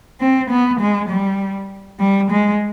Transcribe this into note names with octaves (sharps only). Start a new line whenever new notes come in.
C4
B3
G#3
G3
G3
G#3